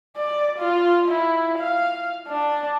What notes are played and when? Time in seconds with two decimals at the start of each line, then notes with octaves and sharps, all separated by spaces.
0.17 D5
0.58 F4
1.08 E4
1.58 F5
2.28 D4